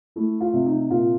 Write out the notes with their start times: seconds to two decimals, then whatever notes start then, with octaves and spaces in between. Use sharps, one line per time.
0.16 A3 E4
0.41 F4
0.53 C3
0.66 D#4
0.90 A#2 F4